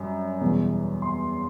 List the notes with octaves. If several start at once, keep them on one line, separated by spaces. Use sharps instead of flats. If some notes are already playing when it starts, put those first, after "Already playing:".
Already playing: F#2 G3
E2 B2 G3
C6